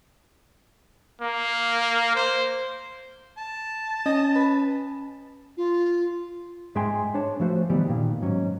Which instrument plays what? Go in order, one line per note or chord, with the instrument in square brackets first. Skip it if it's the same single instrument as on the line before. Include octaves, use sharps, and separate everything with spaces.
[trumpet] A#3
C5
[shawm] A5
[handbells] C#4 [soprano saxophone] D#5
[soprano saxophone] B4
[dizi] F4
[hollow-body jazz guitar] G#2 G#3 E5 G5 G#5 C6
D4 C#5 A5
F3 A3 F#4 C5
D#3 E3 G3 B3
A#2 D#3
G#2 F#3 C#4